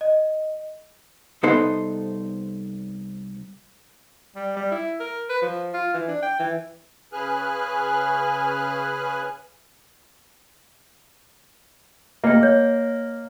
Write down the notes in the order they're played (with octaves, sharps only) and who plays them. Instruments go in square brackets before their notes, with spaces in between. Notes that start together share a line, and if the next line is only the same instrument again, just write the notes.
[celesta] D#5
[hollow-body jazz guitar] C2 B3 D#4 A4 C5
[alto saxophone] G3
G3
E4
A#4
B4
F3
F4
E3
D4
G5
E3
[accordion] C#3 G#4 B4 G#5 F6 F#6
[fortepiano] A#3 [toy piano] D#5 G5
[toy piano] C#5